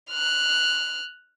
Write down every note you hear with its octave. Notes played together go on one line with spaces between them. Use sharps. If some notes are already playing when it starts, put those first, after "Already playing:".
F6 F#6